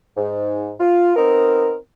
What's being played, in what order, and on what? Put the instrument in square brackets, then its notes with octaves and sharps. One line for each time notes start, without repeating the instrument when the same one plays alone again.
[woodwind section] G#2
F4
B3 C4 D#4 A#4